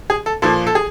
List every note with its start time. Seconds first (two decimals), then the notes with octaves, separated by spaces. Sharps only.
0.10 G#4
0.26 A4
0.42 A#2 F3 A#3 A4
0.67 A4
0.75 G#4